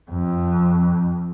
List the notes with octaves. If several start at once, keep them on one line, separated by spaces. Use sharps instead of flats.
F2